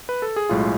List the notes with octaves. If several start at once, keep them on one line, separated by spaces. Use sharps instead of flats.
B4
A4
G#4
B1 A2 G#3 F4